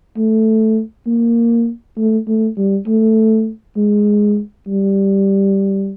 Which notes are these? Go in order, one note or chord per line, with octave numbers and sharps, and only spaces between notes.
A3
A#3
A3
A3
G3
A3
G#3
G3